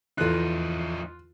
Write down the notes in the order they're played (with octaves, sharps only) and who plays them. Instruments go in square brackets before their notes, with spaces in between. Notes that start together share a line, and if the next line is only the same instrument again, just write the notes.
[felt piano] E2 A4 [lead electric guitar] F3 D#4 [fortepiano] F4 F#6